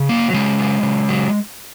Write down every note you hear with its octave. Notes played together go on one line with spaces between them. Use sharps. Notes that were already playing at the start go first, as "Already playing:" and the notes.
Already playing: C#3
F#3 A#3
C#3 G#3
F#3
C#3
F#3